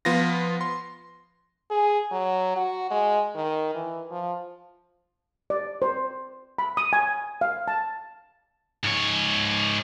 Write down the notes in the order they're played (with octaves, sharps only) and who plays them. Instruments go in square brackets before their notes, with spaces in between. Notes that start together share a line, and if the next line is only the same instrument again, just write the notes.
[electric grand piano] F3 B3 F4 A#6
C6
[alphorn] G#4
F#3
F#4
G#3
D#3
E3
F3
[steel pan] D5
C5
B5
D#6
G#5
F5
A5
[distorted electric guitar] G#2 C#5